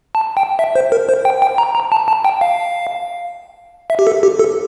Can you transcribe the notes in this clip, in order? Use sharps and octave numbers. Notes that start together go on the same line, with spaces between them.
A5
G5
E5
C5
A#4
C5
G5
G5
A#5
A#5
A5
A5
G5
F5
E5
G4
A4
G4
A4